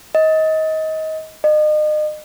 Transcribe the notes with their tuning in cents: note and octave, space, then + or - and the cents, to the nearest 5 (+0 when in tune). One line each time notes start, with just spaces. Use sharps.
D#5 +25
D#5 -35